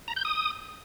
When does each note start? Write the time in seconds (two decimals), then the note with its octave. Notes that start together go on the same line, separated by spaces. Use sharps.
0.08 A#5
0.16 G6
0.25 D#6